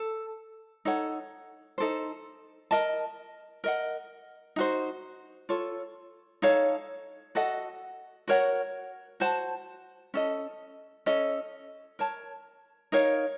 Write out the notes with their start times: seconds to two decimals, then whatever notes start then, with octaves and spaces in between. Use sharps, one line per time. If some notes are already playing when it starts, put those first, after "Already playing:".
Already playing: A4
0.85 D#4 A4 C#5 F#5
1.78 D#4 A4 C5
2.71 A#4 D#5 A5
3.64 A#4 D#5 F#5
4.56 D#4 F#4 C5
5.49 F4 A4 C#5
6.42 D#4 A4 C#5 F5
7.35 F#4 A4 D#5 F#5
8.28 F#4 A#4 C#5 F#5
9.20 F#4 C5 F#5 A5
10.14 C#4 A4 D#5
11.06 C#4 A4 D#5
11.99 A#4 C#5 A5
12.92 D#4 A#4 C#5 F5